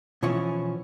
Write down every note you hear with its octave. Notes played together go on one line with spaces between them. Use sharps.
B2 E3 F3 C#4 E4